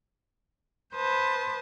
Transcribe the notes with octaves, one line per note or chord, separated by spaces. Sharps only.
B4 C5 A5 D#6